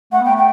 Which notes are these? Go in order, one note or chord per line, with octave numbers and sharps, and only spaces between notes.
A3 F#5
B3
G5
A3
G5